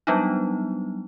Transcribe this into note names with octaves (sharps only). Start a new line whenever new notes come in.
F#3 G3 B3 D4 D#4